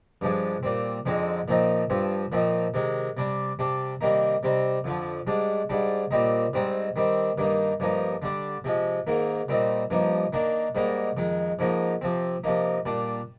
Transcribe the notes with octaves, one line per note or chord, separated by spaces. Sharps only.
G2 F3 G#3 D4
A#2 G3 C4
F2 D3 G#3 C4 D#4
A#2 F3 C4 D#4
G2 F3 C4
A#2 F3 C4 D#4
C3 D#3 G#3
C3 G3 D4
C3 G3 D4
C3 D#3 G3 A#3 D#4
C3 G3 C4 D#4
F2 D3 F3
G#2 G3 D4
G#2 G3 D4
A#2 G3 C4 D#4
G#2 G3 C4 D#4
D#3 G3 C4
G2 D#3 A#3 D#4
G2 F3 A#3 D#4
D3 G3 D4
C3 F3 G#3
G#2 D#3 A#3
A#2 G3 C4 D#4
G2 F3 A#3 D#4
D#3 A#3 D4
G#2 G3 A#3 D#4
F2 D#3 G#3
G#2 F3 A#3 D#4
C3 F3 C4
C3 F3 A#3 D#4
A#2 G3 D4